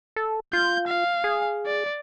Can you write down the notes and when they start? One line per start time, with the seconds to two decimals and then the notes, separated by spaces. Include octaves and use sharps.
0.16 A4
0.53 F4 G6
0.87 F5
1.24 G#4
1.66 D5